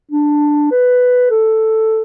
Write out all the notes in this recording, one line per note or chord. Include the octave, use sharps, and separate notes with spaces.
D4
B4
A4